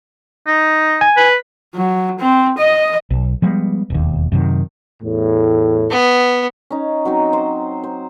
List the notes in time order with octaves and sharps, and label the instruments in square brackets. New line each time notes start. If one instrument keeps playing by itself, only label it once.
[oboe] D#4
[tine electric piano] G#5
[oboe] B4
[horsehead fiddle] F#3
C4
D#5
[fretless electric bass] B1
F3 G3 G#3 B3
E1 D#2
F#2 C3 D#3
[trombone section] E2 A2
[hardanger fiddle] B3
[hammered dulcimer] C#4 D#4
F#3 C4 D#4
C5
C5